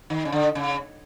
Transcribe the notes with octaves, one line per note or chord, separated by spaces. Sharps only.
D#3
C#3
D3
C#3